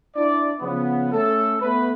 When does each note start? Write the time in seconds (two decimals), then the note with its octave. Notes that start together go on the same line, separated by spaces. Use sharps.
0.16 D4 E4 D5
0.60 C#3 F3 B3
1.12 A3 C#4 A4
1.61 A3 B3 B4